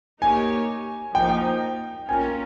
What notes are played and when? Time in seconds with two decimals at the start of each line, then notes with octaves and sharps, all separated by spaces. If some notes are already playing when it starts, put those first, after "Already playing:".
0.22 A#3 D#4 G4 C#5 G#5
1.15 F3 A#3 D#4 G5
2.08 A#3 C#4 F4 A#4 G#5